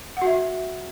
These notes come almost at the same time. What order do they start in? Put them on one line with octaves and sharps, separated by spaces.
F#5 F#4 E5